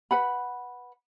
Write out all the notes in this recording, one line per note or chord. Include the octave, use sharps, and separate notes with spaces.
B4 F#5 B5